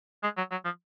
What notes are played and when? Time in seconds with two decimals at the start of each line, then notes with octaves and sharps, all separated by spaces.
0.23 G#3
0.37 F#3
0.51 F#3
0.65 F3